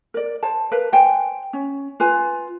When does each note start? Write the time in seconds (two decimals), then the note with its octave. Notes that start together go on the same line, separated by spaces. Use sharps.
0.14 A#4 D5
0.43 C5 A5
0.72 A#4 B4 F5
0.92 C5 G5 G#5
1.53 C#4
2.00 F4 B4 G#5